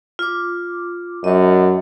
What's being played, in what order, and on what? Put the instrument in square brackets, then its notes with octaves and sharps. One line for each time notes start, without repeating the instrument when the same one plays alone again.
[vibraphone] F4 D6
[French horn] F#2 [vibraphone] D#5 C#6